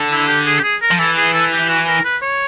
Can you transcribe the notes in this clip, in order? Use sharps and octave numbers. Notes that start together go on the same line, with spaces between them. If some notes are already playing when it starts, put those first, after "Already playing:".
Already playing: D3
E4
G4
G#4
G4
G#4
A#4
F3
E3 A4
G#4
A4
G4
F#4
A#4
B4
C#5